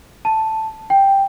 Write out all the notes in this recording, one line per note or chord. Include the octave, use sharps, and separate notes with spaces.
A5
G5